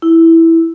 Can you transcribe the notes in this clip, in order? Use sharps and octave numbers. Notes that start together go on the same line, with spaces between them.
E4